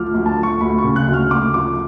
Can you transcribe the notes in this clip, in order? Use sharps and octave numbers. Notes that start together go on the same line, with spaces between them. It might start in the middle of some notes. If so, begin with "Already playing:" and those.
Already playing: D2 F3 D6 F6
D2
A5
F3
C#6
D2 B5
C#6
C#3
F#6
D2
F6
D2 D6
F3 D6